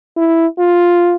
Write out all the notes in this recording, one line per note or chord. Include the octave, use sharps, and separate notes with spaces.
E4
F4